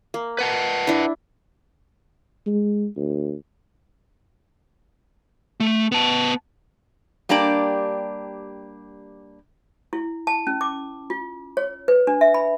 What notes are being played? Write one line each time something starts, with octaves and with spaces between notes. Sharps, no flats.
A#3
B4 F#5 A5
D4 E4
G#3
D2
A3
B3 A5
G3 A#3 D4 G4 D5
E4
A5
C#4
D6
F4
C#5
B4
D4
E5
B5